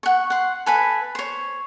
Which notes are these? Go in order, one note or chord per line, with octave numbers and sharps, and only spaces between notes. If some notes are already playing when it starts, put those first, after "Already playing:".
F#5 C#6
F#5 C6
A4 B4 G#5 B5
C5 C#5